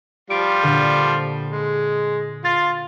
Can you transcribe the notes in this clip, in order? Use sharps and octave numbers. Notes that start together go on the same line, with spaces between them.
F3 G3 F4 D7
A#2 D3
G#3
F4 A6